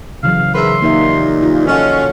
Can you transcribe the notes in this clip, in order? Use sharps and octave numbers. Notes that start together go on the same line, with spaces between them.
C#3 E3 F#3 F5
G#2 A#4 B4 E5 C6
D#2 A#2 A#3 D#4 A#4 E5
F4
C#4 F4 F#4 A4 D#5 F#5